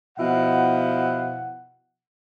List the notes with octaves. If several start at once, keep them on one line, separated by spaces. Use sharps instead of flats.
B2 F3 E4 F#5